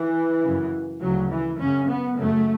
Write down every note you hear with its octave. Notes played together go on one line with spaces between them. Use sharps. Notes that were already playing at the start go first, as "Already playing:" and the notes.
Already playing: E3
F#2 C#3
D2 C#3 F#3
E3
F#2 C#3 C#4
B3
F#2 C#3 A3